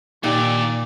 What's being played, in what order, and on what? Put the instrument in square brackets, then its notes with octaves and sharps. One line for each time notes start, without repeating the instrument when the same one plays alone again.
[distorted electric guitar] D#2 [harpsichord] A#2 [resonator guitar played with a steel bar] D#4 G4 [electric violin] D5